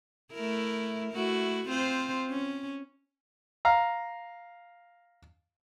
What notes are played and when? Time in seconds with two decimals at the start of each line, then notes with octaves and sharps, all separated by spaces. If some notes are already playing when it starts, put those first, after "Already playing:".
0.32 A3 E4 A#4
1.13 A3 E4 F#4
1.68 C4 F4 C5
2.30 C#4
3.65 F5 A#5